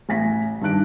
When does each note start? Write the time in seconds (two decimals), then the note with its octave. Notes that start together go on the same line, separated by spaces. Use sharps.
0.09 A1 G#5 A#6 B6
0.61 G2 D#3 D4 F#6 D7